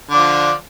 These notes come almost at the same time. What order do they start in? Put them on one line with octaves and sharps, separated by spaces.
D3 D4 F3